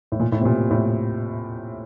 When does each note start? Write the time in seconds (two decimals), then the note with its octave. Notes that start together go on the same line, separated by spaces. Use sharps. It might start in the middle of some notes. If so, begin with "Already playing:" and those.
0.12 A2
0.20 A#2
0.32 A2
0.41 C3
0.45 A#2
0.70 A2